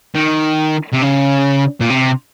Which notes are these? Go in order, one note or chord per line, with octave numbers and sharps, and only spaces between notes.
D#3
C3
C#3
A#2
C3